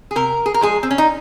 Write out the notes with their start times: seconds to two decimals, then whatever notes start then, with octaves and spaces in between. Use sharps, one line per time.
0.11 G#4
0.16 C3 A#4
0.46 G#4
0.54 A#4
0.61 F3 G#3 G#4
0.83 C4
0.91 C#4
0.98 D#4